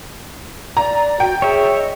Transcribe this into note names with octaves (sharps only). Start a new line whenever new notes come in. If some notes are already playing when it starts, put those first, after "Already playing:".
D5 A#5
F#4 G5
G#4 C#5 E5
D#5